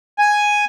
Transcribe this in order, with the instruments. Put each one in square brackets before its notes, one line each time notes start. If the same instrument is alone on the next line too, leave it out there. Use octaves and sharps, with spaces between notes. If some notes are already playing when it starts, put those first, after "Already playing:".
[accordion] G#5